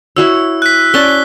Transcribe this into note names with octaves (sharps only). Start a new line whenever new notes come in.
E4 F#4 C#5 E6
F#6 B6
C#4 D5 A5 G7